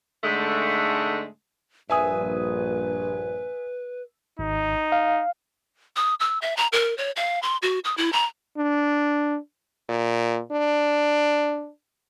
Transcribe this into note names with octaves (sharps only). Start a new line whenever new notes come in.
G#2 D3 G#3 A3
A#1 G2 B4 E5 G#5 D#6
G#1 D#4
F5
D#6
E6
E5
A#5
A#4
C#5
F5
C6
F#4
D#6
E4
A#5
D4
A#2
D4